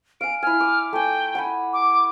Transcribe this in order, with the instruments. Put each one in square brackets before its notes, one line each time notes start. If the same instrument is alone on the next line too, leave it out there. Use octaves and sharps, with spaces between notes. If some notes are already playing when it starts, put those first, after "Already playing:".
[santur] F5 G#5 [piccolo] D7
[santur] E4 G#5 [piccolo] F6
[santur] D6
[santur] A3 G#5 [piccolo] G5
[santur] F#5 G#5 B5
[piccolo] D6